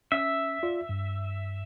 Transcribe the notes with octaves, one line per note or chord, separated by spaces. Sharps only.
C#4 E5
F4 D5
G2